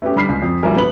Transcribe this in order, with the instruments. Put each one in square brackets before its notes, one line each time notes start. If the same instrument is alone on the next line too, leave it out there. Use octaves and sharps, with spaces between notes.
[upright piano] A3 B3 C#4 G4
D3 G3 B5 F6 B6 C7
C#2
F2
B1 F3 G3 A3 A#4 G#5
F#1 B3 B5 F#7